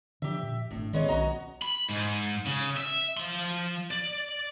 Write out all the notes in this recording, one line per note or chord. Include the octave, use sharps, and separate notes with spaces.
D3 F3 G4 E5
A#2
G#1 A2 D4
D#3 G#3 B3 C#4
B1 F#4 D#5 A#5
B5
G#2
C#3
E5
F3 C6
D5